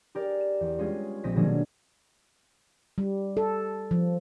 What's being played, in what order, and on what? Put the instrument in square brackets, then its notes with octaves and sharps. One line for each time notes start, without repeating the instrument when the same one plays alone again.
[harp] G4 G#4 A#4 D5
E7
E2
G3 G#3 C#4 F4 G#4
A#1 C4 D#5 A#6 B6
B2 D#3 F#3 A#3 D4 G#4
[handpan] G3
A4
F3